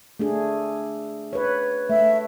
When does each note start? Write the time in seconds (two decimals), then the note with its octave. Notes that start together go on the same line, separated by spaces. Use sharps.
0.19 A3 D4 G#4
1.33 B4 C#5
1.90 A3 E5